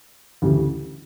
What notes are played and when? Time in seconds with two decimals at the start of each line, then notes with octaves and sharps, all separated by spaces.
0.42 D2 C#3 E3 G3